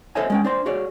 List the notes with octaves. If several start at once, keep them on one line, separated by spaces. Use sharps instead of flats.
A4 C5 C#5 D#5 E5 G#5
G#3 C#4 G5
D4 C5 C6
F#4 G#4 C#5 D5